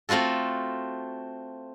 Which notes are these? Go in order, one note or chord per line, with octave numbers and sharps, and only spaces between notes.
A3 C4 F4 F#4 A4